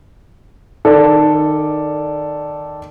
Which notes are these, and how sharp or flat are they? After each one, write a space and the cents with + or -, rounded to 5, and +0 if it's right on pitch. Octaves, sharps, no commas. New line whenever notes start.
D#3 -15 A4 +0 D5 +0